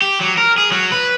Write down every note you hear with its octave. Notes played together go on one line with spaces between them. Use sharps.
G4
F#3
A#4
G#4
F#3
B4